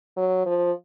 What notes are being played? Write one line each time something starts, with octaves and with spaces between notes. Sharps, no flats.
F#3
F3